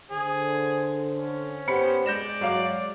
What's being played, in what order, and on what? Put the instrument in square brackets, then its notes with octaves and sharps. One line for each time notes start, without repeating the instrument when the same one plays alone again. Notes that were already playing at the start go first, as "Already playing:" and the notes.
[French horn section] D3 C5 [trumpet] G#4
[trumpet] C#4
[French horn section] B3 G4 C5 [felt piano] B5 C#7
[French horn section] G#3 [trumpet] D5 [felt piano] G6 A#6 E7
[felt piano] F#3 F5 D6